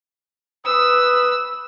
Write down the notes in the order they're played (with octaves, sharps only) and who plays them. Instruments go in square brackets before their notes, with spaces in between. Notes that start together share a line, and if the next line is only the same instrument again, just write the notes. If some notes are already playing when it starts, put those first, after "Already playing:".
[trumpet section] B4 D#6 [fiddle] E6